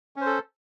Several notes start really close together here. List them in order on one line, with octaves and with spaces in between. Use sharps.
C#4 C5 A4